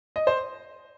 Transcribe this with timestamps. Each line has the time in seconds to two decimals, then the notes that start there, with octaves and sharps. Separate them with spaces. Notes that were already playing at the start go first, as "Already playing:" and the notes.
0.16 D#5
0.27 C5